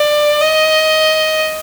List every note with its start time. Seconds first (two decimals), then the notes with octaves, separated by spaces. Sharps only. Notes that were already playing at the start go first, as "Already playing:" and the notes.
Already playing: D5
0.41 D#5